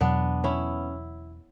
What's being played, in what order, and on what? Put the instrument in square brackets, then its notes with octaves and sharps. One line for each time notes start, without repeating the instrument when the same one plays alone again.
[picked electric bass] E2 B2 F#3 [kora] B3 D4
[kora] C#4 E4